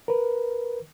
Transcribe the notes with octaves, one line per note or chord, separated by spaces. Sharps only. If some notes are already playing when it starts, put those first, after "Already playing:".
A#4 B4